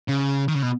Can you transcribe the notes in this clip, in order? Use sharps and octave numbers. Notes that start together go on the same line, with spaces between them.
C#3
D#3
C#3
B2